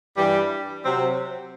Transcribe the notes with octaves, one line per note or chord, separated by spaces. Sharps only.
G2 E3 G3
C3 F#3 C4